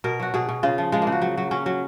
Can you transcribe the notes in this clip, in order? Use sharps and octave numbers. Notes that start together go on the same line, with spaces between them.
B2 A#4
F#3 F#4
B2 G#4
B2
C#3 F4
F3
F3 G#3
A#3
C#3
F#4
F#3
F#3
F#3 C#4
F#3